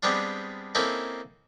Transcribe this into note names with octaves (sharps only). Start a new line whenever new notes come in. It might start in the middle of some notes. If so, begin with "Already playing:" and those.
G3 G#3 B3 C4 D4 F4
A#3 C4 C#4 D#4 E4 A4